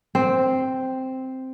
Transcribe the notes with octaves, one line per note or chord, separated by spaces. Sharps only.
C4